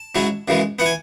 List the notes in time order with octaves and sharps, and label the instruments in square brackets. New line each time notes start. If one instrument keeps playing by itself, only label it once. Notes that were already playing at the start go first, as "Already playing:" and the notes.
Already playing: [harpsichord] A5
G#2 F#3 C#4 E4
F#2 C#3 E3 G#3
E3 B3 F#5
G#5